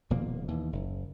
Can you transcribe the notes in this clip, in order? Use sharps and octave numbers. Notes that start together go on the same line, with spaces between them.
D#1 B2 F3 A#3
D#2 E3
F#1